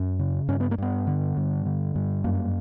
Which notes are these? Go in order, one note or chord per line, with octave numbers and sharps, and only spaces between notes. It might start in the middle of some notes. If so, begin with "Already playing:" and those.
Already playing: F#2 C#4
C#3
G2 C#4
B3
A#3
G2 B3
D3
G2
D3
G2
F#2 A#3